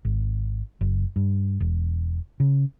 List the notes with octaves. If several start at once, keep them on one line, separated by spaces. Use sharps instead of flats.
G#1
F#1
G2
E1
C#3